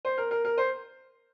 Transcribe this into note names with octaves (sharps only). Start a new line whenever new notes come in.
C5
A#4
A#4
A#4
C5